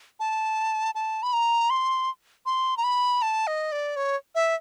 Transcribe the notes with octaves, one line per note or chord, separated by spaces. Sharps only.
A5
A5
B5
A#5
C6
C6
A#5
B5
A5
D#5
D5
C#5
E5